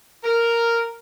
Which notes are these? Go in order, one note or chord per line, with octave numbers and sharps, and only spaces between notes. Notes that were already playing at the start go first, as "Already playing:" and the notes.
A#4